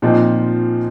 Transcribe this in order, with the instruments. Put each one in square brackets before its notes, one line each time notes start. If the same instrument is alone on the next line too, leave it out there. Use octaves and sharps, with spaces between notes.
[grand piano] A#2 F3 C4 D#4